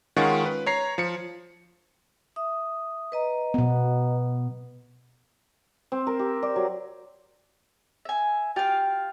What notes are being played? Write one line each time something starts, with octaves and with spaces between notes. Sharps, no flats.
D#3 G#3 C#4 F4 F#5 C#6
B4
C#5 A#5 C7
F3 C#7
E5 D#6
B4 D#5 A#5
B2 B3
C4
A#4
G4
D5
F#3
E5 G#5
F4 G4 F5 G5